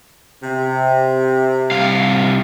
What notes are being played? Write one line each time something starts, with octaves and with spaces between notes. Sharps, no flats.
C3
C2 F5